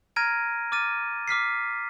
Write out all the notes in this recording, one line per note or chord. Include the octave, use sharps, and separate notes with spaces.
A#5 F6 G#6 A#6 D7 D#7
D6 F6 A6 D#7
D6 F6 B6 C7